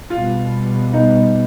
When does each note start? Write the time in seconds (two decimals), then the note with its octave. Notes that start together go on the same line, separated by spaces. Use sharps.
0.10 B2 G3 B3 F4
0.93 D#4